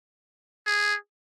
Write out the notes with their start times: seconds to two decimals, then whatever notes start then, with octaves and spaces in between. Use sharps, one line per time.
0.67 G#4